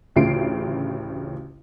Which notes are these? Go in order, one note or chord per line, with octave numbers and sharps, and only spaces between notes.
A1 D2 C#3 F4 C7 D7